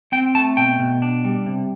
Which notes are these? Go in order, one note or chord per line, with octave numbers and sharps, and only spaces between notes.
C4 G5
A3 A5
B2 G5
B2
D4
G3
C3